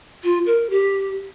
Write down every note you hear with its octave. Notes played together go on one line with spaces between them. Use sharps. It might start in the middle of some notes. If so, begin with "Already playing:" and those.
F4
A#4
G4